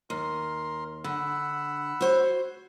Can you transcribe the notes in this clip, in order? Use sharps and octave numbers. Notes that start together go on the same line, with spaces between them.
D#2 A#4 C6
D3 F#5 B5 E6
F#4 C5 C#5